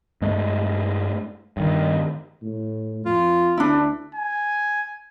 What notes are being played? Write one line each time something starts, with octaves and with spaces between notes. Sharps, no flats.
G2 G#3 A3
G2 D#3
A2
F2 F4
D2 D4 E4
G#5